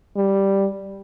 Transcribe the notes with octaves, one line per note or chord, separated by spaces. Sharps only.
G3